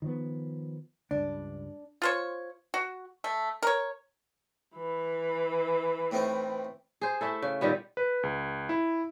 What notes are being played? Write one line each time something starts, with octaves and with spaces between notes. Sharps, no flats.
D#3 F3 B3
C#2 G2 D4
F4 C5 C#5
F#4
A3
A#4 C#5
E3 B5
A2 C4 D#4
G#4 C5
A3 E4 A4
C#3
A#2 D#3 G3 B3
B4
C#2
E4